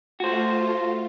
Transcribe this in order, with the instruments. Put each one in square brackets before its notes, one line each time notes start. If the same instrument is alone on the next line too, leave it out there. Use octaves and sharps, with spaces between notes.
[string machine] A3 F4 [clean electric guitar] F#4 C5